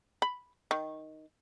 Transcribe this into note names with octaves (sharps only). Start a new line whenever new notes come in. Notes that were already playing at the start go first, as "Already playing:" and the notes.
B5
D#3